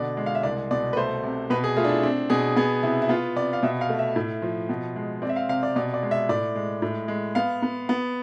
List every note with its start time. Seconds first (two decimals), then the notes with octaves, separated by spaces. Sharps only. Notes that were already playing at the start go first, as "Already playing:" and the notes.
Already playing: B2 D3 D5
0.17 G#3
0.26 F5
0.35 E5
0.43 C2 D5
0.71 B2 D5
0.93 B4
0.97 A3 C5
1.23 C3
1.50 B2 B4
1.64 G#4
1.77 A3 F4
1.84 D4
1.89 E4
2.03 C4 D4
2.30 B2 G#4
2.56 B3 G#4
2.83 C3 E4
3.02 E4
3.09 B3 F4
3.36 C3 D5
3.53 F5
3.63 B2 E5
3.81 F5
3.89 A3
3.99 E5
4.16 A2
4.42 F3
4.69 B2
4.96 G#3
5.22 C4 D5
5.29 E5
5.36 F5
5.49 C3 F5
5.63 D5
5.76 B2 D5
5.94 D5
6.03 G#3
6.11 E5
6.29 A2 D5
6.55 G#3
6.82 A2
7.08 G#3
7.35 B3 F5
7.62 B3
7.89 B3